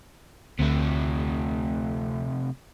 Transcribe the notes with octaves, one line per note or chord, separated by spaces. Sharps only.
D2 C3 A3